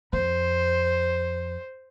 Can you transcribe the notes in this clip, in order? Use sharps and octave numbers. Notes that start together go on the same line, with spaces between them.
F2 C5